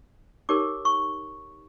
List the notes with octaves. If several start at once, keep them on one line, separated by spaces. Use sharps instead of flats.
D#4 G4 A#4 C#5 D6
C#6